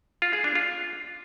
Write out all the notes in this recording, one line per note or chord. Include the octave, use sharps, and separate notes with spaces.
F4
G#4
D4
F4